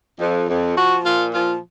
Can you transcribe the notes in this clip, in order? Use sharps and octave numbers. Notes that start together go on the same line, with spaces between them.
F2
F2
F3 F#4
A#2 F4
F3 F4